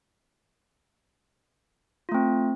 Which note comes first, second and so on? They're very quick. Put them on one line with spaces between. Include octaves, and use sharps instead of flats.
F4 A3 C4